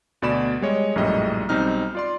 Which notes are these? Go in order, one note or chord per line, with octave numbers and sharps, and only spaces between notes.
D2 B2 D5 B5 E7
G3 G#3 C#5 D#5
A#1 F#2 A2 G3 G#4 D#5
B1 G3 C4 D#4 F6
F4 D5 C6